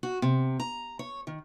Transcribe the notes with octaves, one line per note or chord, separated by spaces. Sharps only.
F#4
C3
A#5
C#5
D#3